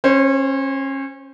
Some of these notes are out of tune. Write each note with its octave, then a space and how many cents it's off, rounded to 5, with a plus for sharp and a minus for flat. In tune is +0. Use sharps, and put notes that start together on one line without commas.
C#4 -30 C5 +0